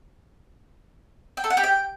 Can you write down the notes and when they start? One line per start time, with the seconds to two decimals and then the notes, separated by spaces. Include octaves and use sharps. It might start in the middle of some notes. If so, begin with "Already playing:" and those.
1.37 G5
1.44 A4
1.50 F#5
1.57 G4
1.64 G5